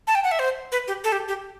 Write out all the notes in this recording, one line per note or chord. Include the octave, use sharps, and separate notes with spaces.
A5
G5
F#5
E5
C5
B4
G4
A4
G4
G4